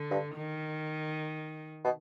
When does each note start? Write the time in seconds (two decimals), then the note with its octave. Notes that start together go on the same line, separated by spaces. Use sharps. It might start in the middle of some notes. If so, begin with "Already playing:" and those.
Already playing: D3
0.11 G2
0.35 D#3
1.84 B2